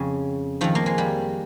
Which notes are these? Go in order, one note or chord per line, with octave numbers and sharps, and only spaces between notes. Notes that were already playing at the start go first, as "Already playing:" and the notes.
Already playing: F2 C#3
F2 D#3 F3
A#3
G#3
G3